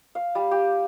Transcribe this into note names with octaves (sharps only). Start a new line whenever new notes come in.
F5
G3
G4